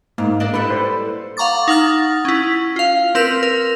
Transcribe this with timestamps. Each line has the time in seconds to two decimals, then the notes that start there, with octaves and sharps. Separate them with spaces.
0.18 G#2 A#3
0.40 D4 D5 D#5
0.54 G3 E4 A4 B4
0.70 B4 C5
1.37 F5 F#5 A#5 C#6 D6 A6
1.68 D#4 F#5 F6 A6
2.25 C#4 E4
2.76 F4 F5
3.15 C4 A#4 B4 E6 F6 E7
3.43 A#4